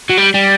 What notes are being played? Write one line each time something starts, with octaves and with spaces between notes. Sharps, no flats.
F#3
G3
G3